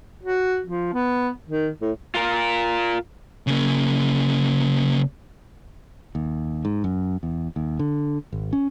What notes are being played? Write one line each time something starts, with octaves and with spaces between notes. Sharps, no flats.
F#4
F3
B3
D#3
A2
F4 A#4
C#3 A#3
D#2
G#2
F#2
E2
D#2
D3
G#1
C#4